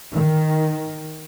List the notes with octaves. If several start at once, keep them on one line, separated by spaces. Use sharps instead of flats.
D#3